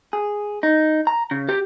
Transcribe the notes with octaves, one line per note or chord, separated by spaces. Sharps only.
G#4
D#4
A#5
C#3
G4